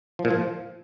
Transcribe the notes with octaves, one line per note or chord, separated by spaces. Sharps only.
F3
A#2
F3